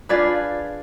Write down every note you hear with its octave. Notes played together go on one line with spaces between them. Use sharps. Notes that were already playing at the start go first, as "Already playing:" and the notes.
D4 F4 G#4 B4 D5